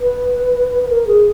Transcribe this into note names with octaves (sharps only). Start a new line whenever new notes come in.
B4
B4
A#4
G#4